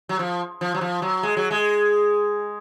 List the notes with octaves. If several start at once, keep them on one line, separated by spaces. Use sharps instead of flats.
F#3
F3
F3
F#3
F3
F#3
G#3
F#3
G#3